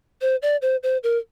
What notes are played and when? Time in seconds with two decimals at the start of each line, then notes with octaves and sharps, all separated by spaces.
0.22 C5
0.42 D5
0.62 C5
0.83 C5
1.03 A#4